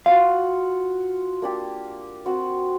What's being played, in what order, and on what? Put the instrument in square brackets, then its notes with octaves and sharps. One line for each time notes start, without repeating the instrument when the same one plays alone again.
[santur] F4 F#4 [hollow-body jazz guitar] F5
[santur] A#3 D4 G4
C4 F#4